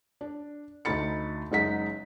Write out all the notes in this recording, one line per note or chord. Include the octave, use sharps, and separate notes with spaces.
D4
D2 A3 D#4 B5 A6 C#7
F#1 G#3 D#4 F#5 B6